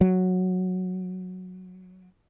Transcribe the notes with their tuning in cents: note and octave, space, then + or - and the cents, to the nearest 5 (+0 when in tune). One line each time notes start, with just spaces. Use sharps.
F#3 -10